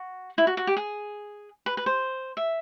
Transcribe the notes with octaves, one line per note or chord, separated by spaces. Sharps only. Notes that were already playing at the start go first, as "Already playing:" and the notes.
Already playing: F#4
E4
F#4
F#4
G4
G#4
B4
B4
C5
E5